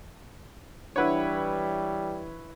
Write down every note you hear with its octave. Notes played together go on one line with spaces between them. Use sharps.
E3 G3 D4 E4 B4 C#5 F#5 F#6